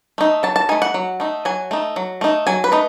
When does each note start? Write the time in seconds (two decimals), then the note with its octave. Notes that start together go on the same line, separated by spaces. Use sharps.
0.18 A3 D#4
0.43 F#3 A5
0.56 A5
0.69 A3 D#4 G#5
0.82 F#5
0.94 F#3
1.20 A3 D#4
1.45 F#3 G#5
1.71 A3 D#4
1.96 F#3
2.21 A3 D#4
2.47 F#3 G#5
2.64 B4
2.72 A3 D#4